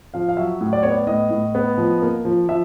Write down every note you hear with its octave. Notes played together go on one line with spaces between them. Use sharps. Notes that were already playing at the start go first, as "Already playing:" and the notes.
F3 F5
F5
F#3 E5
A2
D5
B3 C#5
D5
A2 D#5
A2
B3
F3
A#3
F3
F3 E5